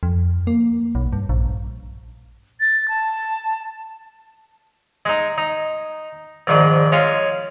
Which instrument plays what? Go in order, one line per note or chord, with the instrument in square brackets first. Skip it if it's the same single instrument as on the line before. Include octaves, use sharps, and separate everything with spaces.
[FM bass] F2
A#3
B1
G2
A#1
[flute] A6
A5
[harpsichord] G#3 D#4
D#4
A#1 G#2 D#3 D4 D#6
G#3 C#4 F4